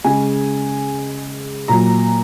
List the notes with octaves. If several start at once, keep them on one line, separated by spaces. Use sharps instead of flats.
C#3 G#3 G#5
A#2 F#3 A#5